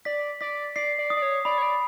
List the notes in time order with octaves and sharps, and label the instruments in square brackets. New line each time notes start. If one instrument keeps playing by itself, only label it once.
[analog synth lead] D5 [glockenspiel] B6
[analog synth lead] D5 [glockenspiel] B6
[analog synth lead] D5 [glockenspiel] C7
[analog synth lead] D5
[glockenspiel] D#6
[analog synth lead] D5
C#5
[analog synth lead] D5 [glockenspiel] B5
[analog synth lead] C#5
D5